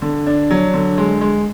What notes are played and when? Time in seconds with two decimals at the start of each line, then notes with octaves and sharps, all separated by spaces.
0.02 D3
0.26 D4
0.50 F#3
0.74 D3
0.98 G#3
1.21 G#3